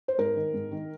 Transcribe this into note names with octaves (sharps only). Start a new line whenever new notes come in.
C5
G#2 A#4
D#3
G#2
D#3